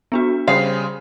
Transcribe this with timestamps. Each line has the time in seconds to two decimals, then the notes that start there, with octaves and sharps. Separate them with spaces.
0.12 B3 D4 F#4
0.48 C#3 G3 G#4 C5 F5 C6